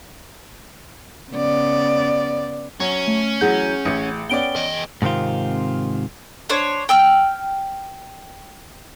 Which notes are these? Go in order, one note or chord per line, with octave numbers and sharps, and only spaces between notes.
C#3 B3 D5
F#3 C#4
A3
E3 F#3 G#4 F#5 G6
A1 C#7
B3 C#4 D5 G5 D7 G7
E2 D#5
G#2 C3 D#3 C4 F4
D4 C5 C#5
G5 E6 F6